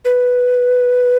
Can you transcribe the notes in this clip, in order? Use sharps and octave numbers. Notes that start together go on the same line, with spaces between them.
B4